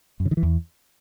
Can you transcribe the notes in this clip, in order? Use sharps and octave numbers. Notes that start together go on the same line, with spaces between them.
F#2
C#3
D#3
E3
E2